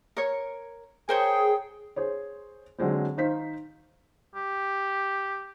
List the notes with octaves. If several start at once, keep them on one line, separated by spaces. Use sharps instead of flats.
A#4 C#5
G#4 A#4 C5 C#5 G5
G#4 C5 C#5
D3 F#3 G#3 C4
D#3 D#4 C5 F5 B6
G4